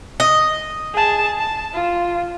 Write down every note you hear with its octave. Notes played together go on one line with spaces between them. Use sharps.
D#5
G#4 A5
A5
F4